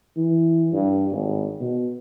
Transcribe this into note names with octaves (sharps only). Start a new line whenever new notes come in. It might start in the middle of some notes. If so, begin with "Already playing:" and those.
E3
G2
G#1
B2